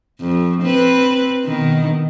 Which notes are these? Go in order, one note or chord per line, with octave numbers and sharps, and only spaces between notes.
F2
C4 B4
B2 D#3